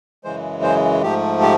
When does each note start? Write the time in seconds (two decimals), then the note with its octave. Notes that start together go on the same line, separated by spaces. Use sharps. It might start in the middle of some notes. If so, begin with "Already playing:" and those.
0.24 F#2 C#3 E3 G#3 C5
0.63 C5
1.02 G#2 F3 A3 G4
1.42 G4